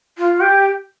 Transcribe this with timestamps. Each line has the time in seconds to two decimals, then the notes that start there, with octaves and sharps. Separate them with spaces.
0.18 F4
0.40 G4